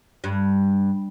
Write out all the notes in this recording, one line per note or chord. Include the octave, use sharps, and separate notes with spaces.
G2